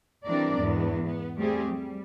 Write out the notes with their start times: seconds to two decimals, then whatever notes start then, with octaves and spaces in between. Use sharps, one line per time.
0.25 E3 G3 C4 D4 A#4 D5
0.58 E2 G#2 B3
1.05 B3
1.37 G3 A3 C4 G4 G#4
1.71 G3